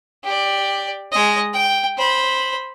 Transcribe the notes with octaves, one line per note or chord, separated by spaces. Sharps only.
G4 D5
G#3 D#5
G5
C5 B5